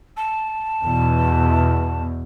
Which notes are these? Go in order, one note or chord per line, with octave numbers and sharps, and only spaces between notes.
A5
E2 B2